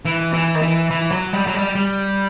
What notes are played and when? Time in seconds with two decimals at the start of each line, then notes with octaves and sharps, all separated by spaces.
0.05 E3
0.34 E3
0.55 D#3
0.62 E3
0.91 E3
1.11 F#3
1.33 G3
1.47 F#3
1.54 G3
1.75 G3